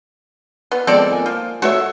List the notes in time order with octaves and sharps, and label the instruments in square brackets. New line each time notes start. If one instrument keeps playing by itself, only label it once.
[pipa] B3
[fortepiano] F3 G#3 B3 [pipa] C4 A4 D5
[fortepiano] A#3 G#5
[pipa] F3
[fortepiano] A3 [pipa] F#4 C#5 E5